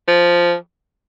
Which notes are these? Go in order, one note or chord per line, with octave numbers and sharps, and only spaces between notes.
F3